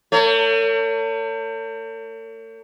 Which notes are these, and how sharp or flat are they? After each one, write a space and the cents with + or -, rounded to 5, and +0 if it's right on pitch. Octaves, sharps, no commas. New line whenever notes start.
A3 +45 C#5 +25